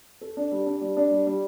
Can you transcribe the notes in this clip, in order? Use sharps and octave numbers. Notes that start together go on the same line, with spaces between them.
A4
D4
G3
D4
G3
D4
G3
G3